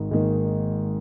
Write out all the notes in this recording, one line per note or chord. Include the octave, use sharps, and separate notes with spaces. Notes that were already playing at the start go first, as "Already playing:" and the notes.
Already playing: G#1 G#2 D#3 D#4
G#1 G#2 D#3 A#3 D#4